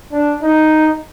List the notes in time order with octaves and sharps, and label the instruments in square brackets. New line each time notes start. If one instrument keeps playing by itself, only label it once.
[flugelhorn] D4
D#4